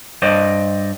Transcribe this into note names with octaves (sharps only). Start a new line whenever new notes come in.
G2 C5 D5 D#5